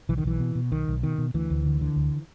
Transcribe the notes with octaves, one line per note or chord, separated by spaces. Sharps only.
B1 E3
D#3
B1 E3
B2
B2
B1 D#3
B1
B2 D#3
B2
D2 E3
D2
D3
D3
D2